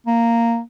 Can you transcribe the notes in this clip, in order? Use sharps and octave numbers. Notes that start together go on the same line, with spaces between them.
A#3